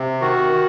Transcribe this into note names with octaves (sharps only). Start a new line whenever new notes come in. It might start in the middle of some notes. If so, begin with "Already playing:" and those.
Already playing: C3
D#3 F#4
D#3